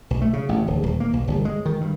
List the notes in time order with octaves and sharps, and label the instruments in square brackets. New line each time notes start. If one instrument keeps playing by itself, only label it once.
[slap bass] B1
A3
C#3
A1
D1
D#1
A#3
B1
G1
G#3
D#3
G2